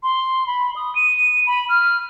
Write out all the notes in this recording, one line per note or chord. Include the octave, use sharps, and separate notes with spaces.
C6
B5
D#6
D#7
B5
F6